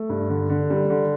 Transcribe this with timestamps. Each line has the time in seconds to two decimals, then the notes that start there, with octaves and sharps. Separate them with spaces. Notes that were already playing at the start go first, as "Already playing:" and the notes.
Already playing: A3
0.09 G2
0.29 D3
0.49 D3
0.70 G3
0.90 D3